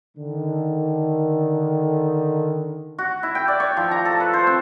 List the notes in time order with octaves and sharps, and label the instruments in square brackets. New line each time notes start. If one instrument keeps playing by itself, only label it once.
[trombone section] D3 D#3
[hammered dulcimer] F#4
E4
G5
D5
C#5
F3
A#5
A4
B4
C5
C4